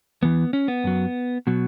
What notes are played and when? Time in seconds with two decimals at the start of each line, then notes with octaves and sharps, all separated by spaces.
0.22 E2 E3 B3
0.53 C#4
0.68 B3
0.84 F#2 F#3
1.47 B2 F#3